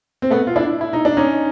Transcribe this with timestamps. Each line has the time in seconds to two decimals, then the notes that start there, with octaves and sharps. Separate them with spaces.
0.22 C4
0.30 A3 B3
0.47 F4
0.56 D4 E4
0.81 E4
0.93 D#4
1.05 D4
1.17 C#4 D#4